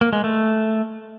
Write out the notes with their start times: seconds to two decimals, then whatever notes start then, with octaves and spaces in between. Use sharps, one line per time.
0.01 A#3
0.13 G#3
0.24 A3